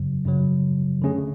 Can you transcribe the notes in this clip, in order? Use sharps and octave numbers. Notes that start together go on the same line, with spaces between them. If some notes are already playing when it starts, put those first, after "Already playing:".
Already playing: F#2 C#3 F#3
F#2 C#3 F#3
D3 A3 C#4 G#4